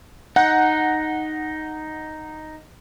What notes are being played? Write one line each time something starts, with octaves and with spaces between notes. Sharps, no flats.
D#4 F#5